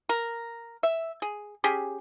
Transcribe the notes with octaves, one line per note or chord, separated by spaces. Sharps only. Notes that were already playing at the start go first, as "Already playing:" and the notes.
A#4
E5
G#4
C#4 G4 G#4